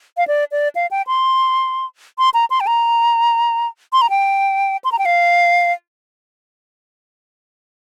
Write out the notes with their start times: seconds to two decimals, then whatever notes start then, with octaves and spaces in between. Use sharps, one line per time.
0.17 F5
0.27 D5
0.51 D5
0.75 F5
0.91 G5
1.07 C6
2.18 C6
2.34 A#5
2.50 C6
2.60 G5
2.67 A#5
3.93 C6
4.01 A#5
4.10 G5
4.84 C6
4.92 A#5
4.98 G5
5.05 F5